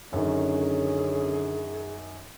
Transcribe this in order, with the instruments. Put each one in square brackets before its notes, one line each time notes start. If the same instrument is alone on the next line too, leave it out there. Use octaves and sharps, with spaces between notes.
[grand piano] F#2 D#3 [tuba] D3 [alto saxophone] C#4 [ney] G#4